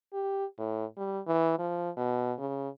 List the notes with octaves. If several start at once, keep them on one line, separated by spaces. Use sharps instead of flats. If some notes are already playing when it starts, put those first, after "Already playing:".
G4
A2
G3
E3
F3
B2
C#3